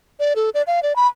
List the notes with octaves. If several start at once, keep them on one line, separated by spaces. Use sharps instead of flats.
D5
A4
D5
F5
D5
B5